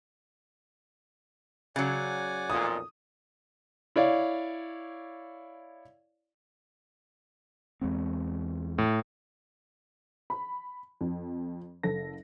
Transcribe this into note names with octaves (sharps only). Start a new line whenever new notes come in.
C#3 F#3 D5 F#5 G#5
B1 F2 A#2 D#6
E4 C#5 D5 F5
E2 G#3 C4
A2
B5
F2
F#1 A4 A#6